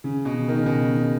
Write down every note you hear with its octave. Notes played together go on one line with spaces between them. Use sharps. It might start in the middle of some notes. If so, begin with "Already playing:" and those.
C#3
B2
C#3
D#3
C#3
B2
C#3